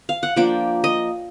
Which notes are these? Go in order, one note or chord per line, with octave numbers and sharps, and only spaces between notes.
F5
F#5
F3 A#3 D4 G5
D#5